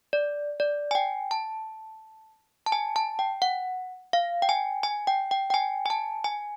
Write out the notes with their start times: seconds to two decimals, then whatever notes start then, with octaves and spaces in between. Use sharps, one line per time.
0.13 D5
0.60 D5
0.91 G#5
0.95 G5
1.31 A5
2.66 A5
2.72 G#5
2.96 A5
3.19 G5
3.42 F#5
4.13 F5
4.42 G5
4.49 G#5
4.83 G#5
5.07 G5
5.31 G5
5.50 G5
5.54 G#5
5.86 G#5
5.90 A5
6.24 G#5